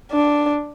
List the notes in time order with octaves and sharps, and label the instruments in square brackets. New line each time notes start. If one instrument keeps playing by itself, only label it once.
[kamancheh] D4